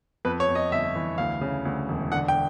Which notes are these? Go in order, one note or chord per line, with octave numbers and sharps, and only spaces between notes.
F2 B4
C#5
F2
D#5
G1 E5
E3
D2 F5
C#3
D2
E1
D3 F#5
G5